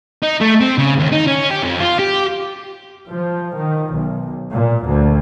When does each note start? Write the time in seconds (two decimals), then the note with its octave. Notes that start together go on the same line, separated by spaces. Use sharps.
0.23 D#4
0.41 A3
0.61 C4
0.78 C#3
0.99 D#2
1.12 D#4
1.27 C#4
1.51 G4
1.63 F2
1.80 F4
1.99 G4
3.09 F3
3.55 D#3
3.95 B1
4.50 A#2
4.85 D2